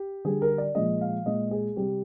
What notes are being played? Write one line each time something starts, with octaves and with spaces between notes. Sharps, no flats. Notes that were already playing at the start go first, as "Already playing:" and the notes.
Already playing: G4
D3 G3 G#4
A#4
D5
A#2 F3 G#3 D#5
F5
A#2 G#3 D#5
G#4
C3 G3 G4